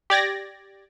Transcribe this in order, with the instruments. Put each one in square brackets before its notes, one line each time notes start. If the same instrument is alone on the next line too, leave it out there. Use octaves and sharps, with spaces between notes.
[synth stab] G4 D5 G#6 A#6